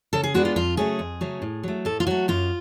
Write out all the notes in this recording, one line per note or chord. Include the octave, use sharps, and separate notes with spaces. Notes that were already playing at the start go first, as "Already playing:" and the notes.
C#3 A4
G#4
G#3 B3 D4 F#4
F4
F2 F4
C#3 F#3 A3 C#4 G#4
F2
C#3 F#3 A3 C#4
A2
F#3 A3
A2 A4
F4
F#3 A3 F#4
F#2 F4